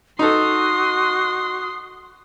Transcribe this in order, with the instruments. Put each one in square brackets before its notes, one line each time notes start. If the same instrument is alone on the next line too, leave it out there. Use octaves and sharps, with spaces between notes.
[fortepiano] D#4 A4 [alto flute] F#4 [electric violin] C6 [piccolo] D#6